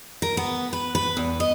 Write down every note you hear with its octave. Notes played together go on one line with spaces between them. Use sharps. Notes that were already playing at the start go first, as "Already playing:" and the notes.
A#4
B3
B4
B4
E2
D#5